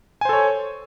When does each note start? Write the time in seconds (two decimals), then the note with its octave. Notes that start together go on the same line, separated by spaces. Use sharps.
0.21 G#5
0.25 C5
0.29 A4
0.33 C#5